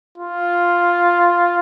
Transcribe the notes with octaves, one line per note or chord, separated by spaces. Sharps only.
F4